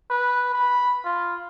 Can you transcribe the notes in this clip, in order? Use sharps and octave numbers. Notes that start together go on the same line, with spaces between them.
B4
B5
F4